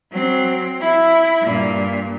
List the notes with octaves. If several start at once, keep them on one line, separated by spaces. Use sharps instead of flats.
F#3 C4
E4
G2 A#2